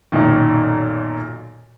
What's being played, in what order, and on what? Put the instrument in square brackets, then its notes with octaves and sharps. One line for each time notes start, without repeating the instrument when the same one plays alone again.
[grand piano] B1 F#2 A#2 D#3